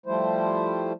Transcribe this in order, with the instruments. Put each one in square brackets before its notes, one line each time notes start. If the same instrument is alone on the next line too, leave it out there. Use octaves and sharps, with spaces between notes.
[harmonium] F3 G3 A3 E4 C5